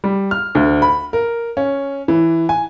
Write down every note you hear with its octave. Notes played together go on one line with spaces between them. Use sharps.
G3
F6
D2
B5
A#4
C#4
E3
G#5